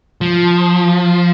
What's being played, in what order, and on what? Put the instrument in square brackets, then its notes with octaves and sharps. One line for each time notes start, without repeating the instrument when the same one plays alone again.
[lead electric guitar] F3